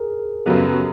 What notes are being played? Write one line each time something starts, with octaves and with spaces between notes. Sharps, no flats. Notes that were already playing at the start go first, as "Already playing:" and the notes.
Already playing: G#4 A#4
F#2 C#3 F#3 B3 G4 A4